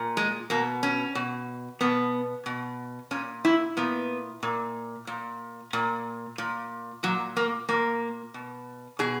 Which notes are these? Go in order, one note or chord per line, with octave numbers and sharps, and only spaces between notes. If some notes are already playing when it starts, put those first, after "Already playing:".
Already playing: A#2
G#3
B2 A#3
C#4
B2
B2 B3
B2
A#2 C#4
E4
A#2 B3
A#2
A#2
A#2
A#2
A#2 F#3
A#3
A#2 A#3
B2
B2 G#4